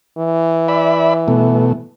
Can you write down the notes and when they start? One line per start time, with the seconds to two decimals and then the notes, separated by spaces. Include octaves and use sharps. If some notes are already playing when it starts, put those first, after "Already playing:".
0.18 E3
0.68 D5 E5 B5
1.28 B2 A3